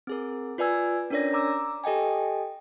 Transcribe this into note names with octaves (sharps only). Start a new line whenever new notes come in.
C4 G#4 A#4
F4 B4 D5 G#5 E6 G#6
C#4 D4 A#4 C#5 D5 A#6
A#5 D6 E6
G4 A4 D#5 G5 G#5